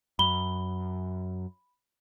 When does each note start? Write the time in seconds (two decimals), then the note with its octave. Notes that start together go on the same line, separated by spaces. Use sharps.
0.19 F#2 B5 G7